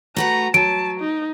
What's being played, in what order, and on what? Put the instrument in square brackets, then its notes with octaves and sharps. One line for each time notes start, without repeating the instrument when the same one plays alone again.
[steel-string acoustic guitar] A3 F#4 B4 [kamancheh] A#5
[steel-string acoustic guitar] F#3 [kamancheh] A5 [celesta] D7
[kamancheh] D#4